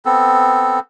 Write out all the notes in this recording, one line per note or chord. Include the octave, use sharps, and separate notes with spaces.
B3 C4 A4